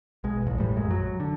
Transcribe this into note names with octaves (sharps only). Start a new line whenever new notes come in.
B1 G#3
E1 A1
A2 G3
A#1 F#2 G#3
F#3
D3